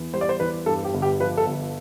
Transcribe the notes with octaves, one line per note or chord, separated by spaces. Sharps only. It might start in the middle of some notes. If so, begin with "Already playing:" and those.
Already playing: E2
G3 C5
D5
C5
E2 B4
G2 A4
G4
G1
G4
F3 B4
A4
G1